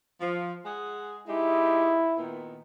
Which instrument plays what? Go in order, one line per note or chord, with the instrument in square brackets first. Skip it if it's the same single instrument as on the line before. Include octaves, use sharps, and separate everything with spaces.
[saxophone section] F3
G#3 G#4 F#5
[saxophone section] G#3 D#4 G4 [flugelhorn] E4
[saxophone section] A#2 D#3 B3